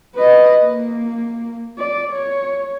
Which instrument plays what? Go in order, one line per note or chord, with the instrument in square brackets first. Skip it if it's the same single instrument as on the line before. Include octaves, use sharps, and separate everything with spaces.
[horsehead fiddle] B4 D#5
A#3
D5
C#5